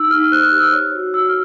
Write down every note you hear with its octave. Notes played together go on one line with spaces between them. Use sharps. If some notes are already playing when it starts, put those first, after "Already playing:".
Already playing: D#4 E6
D#4 F6
C5 F#6
F6
G4
E6
C#5
F#4
F#4 E6
F6